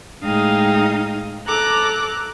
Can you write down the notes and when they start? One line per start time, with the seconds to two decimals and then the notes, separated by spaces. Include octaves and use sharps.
0.24 A2 G#3 D#4 F5 G5 D#6
1.48 A4 A#5 D6 F#6